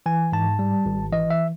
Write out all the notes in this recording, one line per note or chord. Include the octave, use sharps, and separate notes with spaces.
E3 G#5
G#2 A5
G3
G#1
E3 D#5
E5